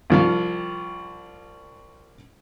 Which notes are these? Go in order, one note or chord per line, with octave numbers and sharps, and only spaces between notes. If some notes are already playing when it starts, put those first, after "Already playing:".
C2 F3 F5